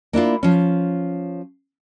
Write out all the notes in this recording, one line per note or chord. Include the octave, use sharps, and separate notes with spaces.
A#3 D4 E4 F4
F3 C#4